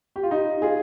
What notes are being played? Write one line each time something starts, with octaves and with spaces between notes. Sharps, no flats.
G4
F4
D#4 G4
F4 G#4